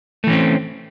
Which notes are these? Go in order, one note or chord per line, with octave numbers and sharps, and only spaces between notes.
E3 A3 C4 C#4